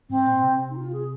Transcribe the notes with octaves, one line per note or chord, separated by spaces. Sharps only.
G#2 C4
A#2
C3
D#4
F4
G#4